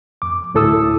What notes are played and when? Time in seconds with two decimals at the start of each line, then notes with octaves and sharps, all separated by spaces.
0.22 F2 D6
0.54 D2 A2 E4 A4 D#6 E6